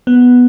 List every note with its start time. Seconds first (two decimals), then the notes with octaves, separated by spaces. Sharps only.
0.07 B3